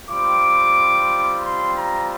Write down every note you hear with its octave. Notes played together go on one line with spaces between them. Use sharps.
G3 C4 F4 D6
C6
A#5